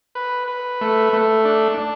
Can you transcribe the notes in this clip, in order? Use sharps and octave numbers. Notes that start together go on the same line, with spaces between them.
B4
B4
A3
A3
D4
D4